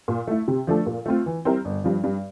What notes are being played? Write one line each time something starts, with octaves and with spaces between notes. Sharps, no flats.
A#2
A3 E4
C3
F3 A3 D4 A4
A#2
A3 C4 F4
E3
G3 C4 E4 A#4
G1
G2 F3
G2